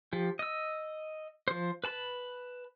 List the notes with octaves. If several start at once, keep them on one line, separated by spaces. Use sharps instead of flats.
F3 G4
D#5 E6
F3 C5
B4 A5 B5